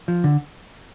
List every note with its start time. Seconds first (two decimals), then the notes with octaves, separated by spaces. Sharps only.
0.08 F3
0.24 D3